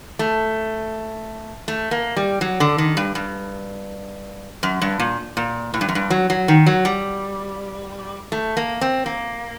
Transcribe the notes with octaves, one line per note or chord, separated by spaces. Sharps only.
A3
A3
A#3
G3
F#3
D3
D#3
G2
G2
F#2
G2
A#2
A#2
A2
G2
F#2
G2
F#3
F#3
D#3
F#3
G3
A3
A#3
C4
A#3